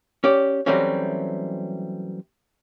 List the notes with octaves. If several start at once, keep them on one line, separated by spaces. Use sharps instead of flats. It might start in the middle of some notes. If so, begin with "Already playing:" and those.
C#4 G4 D5
E3 F#3 G3 A3 C4 C#4